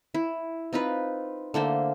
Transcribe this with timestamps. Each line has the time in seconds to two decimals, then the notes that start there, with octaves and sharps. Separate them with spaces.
0.14 E4
0.73 C4 D#4 F4 B4
1.54 D3 A3 A#3 C5